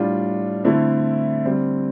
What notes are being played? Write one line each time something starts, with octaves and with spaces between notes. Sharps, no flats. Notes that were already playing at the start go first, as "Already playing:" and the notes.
Already playing: A2 G3 D4 F4
D3 A3 C4 E4
D3 G3 C4